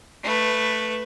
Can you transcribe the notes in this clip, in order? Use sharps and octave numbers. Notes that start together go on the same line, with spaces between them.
A3 B4